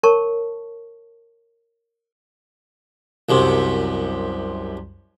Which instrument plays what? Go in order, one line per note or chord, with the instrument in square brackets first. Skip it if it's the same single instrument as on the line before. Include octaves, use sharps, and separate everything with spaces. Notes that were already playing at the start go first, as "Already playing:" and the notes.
[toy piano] A#4 C#5 A5 C#6
[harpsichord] C2 F#2 C3